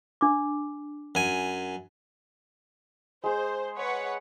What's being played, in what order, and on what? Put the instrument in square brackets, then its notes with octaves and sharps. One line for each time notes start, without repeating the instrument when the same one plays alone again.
[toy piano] D4 D6
[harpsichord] F#2 G#5
[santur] G#3 G#4 [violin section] C5
[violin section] B4 C#5 F#5